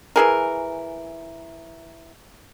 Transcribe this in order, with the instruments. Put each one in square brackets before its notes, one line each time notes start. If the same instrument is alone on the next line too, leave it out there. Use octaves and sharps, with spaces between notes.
[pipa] E3 G#4 A#4